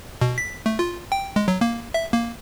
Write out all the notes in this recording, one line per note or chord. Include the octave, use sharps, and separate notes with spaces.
B2
B6
A3
F4
G5
G#3
F#3
A#3
E5
A#3